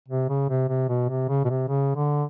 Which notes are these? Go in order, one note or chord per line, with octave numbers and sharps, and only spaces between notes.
C3
C#3
C3
C3
B2
C3
C#3
B2
C3
C#3
D3